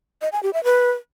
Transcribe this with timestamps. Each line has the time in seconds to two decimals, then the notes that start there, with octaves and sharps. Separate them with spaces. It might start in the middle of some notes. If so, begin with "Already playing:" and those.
0.22 D#5
0.32 G#5
0.43 G4
0.53 E5
0.64 B4